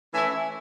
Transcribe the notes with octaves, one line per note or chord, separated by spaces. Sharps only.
E3 A3 C#4 E4 E5 G#5